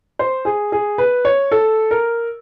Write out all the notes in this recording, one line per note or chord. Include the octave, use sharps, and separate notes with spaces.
C5
G#4
G#4
B4
C#5
A4
A#4